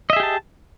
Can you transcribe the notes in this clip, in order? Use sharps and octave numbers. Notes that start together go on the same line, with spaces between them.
G4 G#4 D#5 E5 A5